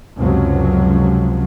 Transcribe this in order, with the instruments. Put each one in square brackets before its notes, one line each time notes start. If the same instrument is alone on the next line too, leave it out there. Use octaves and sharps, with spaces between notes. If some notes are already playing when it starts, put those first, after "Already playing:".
[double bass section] C#2 F#2 C3 F3 F#3